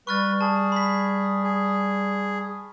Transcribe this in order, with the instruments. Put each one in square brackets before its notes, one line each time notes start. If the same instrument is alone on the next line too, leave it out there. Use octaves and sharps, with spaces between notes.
[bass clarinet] G3 [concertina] B4 [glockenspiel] C#6 F6 A6
[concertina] G#4 [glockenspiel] A5
[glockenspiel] B5 B6
[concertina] G#4